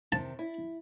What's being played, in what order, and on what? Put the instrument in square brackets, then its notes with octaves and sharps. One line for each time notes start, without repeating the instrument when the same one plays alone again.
[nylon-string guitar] C3 D#3 [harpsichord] A5
[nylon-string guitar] E4